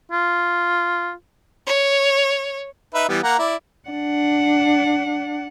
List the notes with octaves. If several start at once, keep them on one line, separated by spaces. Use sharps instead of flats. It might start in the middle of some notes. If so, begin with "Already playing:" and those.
F4
C#5
D#4 B4 E5
E3 G3 B3
A#3 F#5 A#5
E4 D5
D4 F#5